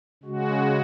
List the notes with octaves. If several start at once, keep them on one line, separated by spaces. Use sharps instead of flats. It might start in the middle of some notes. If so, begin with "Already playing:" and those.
C#3 G#3 F#4